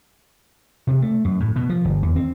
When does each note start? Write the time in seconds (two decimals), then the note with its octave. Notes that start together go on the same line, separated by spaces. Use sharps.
0.87 C3
1.02 A3
1.25 F#2
1.40 A2
1.56 B2
1.69 F3
1.85 G1
2.03 E2
2.16 C4